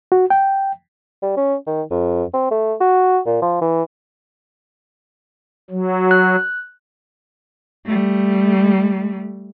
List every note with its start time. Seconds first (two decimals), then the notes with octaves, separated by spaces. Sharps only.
0.12 F#4
0.30 G5
1.22 G3
1.37 C#4
1.67 D#3
1.91 F2
2.34 C4
2.51 A3
2.80 F#4
3.26 A#2
3.42 F3
3.61 E3
5.70 F#3
6.11 F#6
7.86 G3 A3